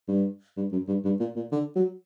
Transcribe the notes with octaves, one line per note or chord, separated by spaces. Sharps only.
G2
G2
F#2
G2
G2
A#2
A#2
D3
F#3